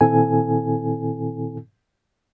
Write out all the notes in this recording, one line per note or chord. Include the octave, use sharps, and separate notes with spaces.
A#2 D#3 C4 E4 A4 G#5